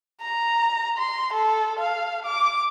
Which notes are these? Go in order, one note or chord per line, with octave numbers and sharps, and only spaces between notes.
A#5
C6
A4
F5
D6